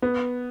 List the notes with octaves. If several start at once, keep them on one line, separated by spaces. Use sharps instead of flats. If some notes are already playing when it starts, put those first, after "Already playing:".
B3